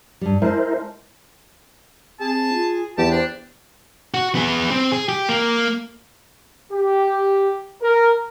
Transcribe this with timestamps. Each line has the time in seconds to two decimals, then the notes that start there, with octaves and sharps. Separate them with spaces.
0.21 G2 G3
0.42 G#3 E4 A#4 C5 A5
2.20 C4 G#4 A5
2.54 F4
2.98 E2 G4 B4 A5
3.11 D4 C5
4.14 F#4
4.35 B3 G#4
4.71 C4
4.92 G#4
5.09 G4
5.29 A#3
6.72 G4
7.82 A#4